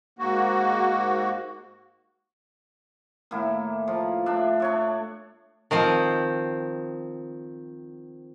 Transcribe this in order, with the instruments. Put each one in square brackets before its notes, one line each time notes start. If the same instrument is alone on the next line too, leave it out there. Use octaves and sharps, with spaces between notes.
[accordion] G#2 A#3 F#4
[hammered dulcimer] A2 D#3 A#3 E4
F3
A2 D4 E5
D4 C#5 E5
[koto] D#3 F3 C4